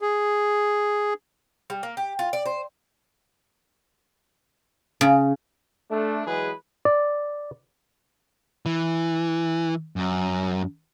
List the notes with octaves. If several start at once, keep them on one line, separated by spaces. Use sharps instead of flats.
G#4
G3
A#3
G4
F4
D5
C5
C#3
A3 D4
E3 F#3 G#3 G#4 B4
D5
E3
F#2